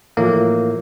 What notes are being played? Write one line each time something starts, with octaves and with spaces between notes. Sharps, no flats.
A2 E3 F3 A#3 F4